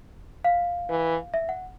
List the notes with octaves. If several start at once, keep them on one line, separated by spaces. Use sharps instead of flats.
F5
E3
E5
F#5